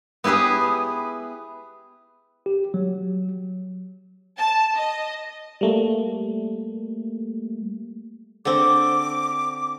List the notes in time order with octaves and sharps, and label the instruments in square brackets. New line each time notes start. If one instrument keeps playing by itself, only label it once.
[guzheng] B3 E4 G4 G#4 B4
[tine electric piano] G4
F#3
[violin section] A5
D#5
[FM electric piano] G3 A3 A#3
[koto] D3 C4 [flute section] D6